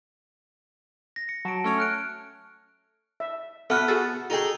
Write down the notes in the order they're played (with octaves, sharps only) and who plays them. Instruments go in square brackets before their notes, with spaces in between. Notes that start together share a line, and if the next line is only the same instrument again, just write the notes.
[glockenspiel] A#6
C#7
[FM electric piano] F#3 [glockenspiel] A5 D7
[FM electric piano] A3 C#4 C#5
[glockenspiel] F6 F#6 D7
[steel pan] E5
[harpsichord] B3 [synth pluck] F#4 F#5 [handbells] A4 F6 F#6 [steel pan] E5 A5
[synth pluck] F#4 G#4 A4 [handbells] A6
[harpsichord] D#4 G#4 [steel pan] F#4 A4 G5